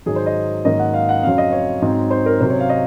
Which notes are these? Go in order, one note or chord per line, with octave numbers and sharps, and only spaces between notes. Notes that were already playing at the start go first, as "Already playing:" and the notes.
G#2 D#3 F#3 G#4
C5
D#5
G#2 D#3 F#3 A#3 C#4 D#5
F#5
F5
F#5
F2 C#3 F#3 C4 F5
D#5
C#5
G#2 F#3 C4
C5
A#4
C3 F#3 C#4 C5
C#5
F5
D#5